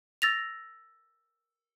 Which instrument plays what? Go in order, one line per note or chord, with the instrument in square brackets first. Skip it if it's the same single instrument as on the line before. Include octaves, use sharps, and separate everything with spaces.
[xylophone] E6 A6 A#6 F7